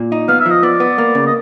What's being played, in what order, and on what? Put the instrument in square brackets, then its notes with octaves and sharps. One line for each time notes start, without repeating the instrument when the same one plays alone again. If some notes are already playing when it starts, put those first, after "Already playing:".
Already playing: [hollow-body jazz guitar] A#2
D#4
[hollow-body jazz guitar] B3 [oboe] F5
[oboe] E5
[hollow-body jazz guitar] F3
[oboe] D#5
[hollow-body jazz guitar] B3 [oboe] D5
[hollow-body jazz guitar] B3
A#3
C#3
[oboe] D#5